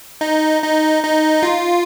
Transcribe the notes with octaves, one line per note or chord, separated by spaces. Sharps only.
D#4
D#4
D#4
F4